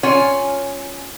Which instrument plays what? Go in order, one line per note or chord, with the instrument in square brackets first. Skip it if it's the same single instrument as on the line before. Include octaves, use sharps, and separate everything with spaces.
[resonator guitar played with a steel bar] C#4 F4 C#5 F#5 G#5